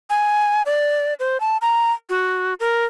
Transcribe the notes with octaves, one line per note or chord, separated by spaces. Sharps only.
G#5
D5
C5
A5
A#5
F#4
A#4